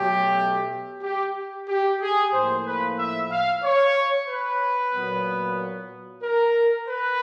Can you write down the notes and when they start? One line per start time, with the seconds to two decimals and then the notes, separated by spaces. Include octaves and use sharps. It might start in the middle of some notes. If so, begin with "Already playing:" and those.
Already playing: B2 F#3 A3 G4
1.02 G4
1.69 G4
2.01 G#4
2.33 A2 F3 A#3 C5
2.66 B4
2.98 E5
3.30 F5
3.63 C#5
4.28 B4
4.93 A#2 F#3 B3
6.23 A#4
6.88 B4